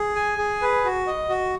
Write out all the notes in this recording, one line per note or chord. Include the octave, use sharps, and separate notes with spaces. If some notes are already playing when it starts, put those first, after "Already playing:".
Already playing: G#4
G#5
G#4
B4
F#4
D#5
F#4